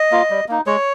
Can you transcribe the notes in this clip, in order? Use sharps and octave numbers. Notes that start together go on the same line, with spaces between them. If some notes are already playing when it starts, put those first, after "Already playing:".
Already playing: D#5
A#3 F4
G3
A#3 D#4
G#3 C#5